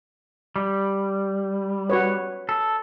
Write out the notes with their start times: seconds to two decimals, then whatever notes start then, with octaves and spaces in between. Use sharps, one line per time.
0.56 G3
1.90 F#4 B4 C#5
2.49 A4